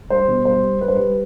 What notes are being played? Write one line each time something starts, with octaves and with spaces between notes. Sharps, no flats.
G3 C5
B2
G3 C5
G3
G3 B4
C5
G3 B4